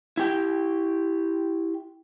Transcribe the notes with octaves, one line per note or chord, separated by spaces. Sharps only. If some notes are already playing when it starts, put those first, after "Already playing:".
E4 G4 G5